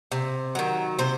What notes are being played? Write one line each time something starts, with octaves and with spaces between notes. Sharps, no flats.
C3
D#3 F#3
C3 C5